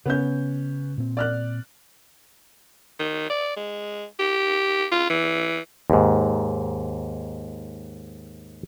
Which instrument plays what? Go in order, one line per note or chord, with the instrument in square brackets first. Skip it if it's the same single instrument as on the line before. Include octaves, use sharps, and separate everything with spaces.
[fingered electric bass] C#3 [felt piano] B3 C#4 G6
[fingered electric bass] A#2 C4
[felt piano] D5 F6 F#6
[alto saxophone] D#3
D5
G#3
G4
F4
E3
[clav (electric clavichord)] D#2 G#2